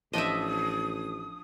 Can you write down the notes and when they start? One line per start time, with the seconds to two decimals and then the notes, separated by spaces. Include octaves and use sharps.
0.13 A1 F3 D4 D#5 E5 G5 D#6